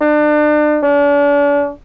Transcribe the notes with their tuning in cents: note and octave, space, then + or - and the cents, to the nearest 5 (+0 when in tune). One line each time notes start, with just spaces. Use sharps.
D4 +35
D4 -40